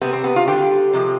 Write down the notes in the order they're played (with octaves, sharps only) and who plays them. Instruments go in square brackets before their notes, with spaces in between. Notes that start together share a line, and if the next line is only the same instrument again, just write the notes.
[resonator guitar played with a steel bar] C3 G3 B3
C4
B3
F4
D3 G3 G4
C3 F3 G#3